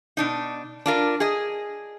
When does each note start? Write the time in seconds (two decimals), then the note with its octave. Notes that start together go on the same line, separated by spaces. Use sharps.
0.17 B2 D4 D#4
0.86 D4 F4 A#4
1.20 G#4 D#5